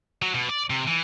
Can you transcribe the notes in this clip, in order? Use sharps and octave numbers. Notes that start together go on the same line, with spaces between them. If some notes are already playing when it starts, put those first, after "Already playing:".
F#3
B2
D5
C3
E3